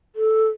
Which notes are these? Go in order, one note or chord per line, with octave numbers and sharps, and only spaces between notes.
A4